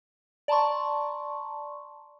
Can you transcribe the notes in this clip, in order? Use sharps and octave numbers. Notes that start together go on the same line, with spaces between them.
D5 A5 A#5 C6 C#6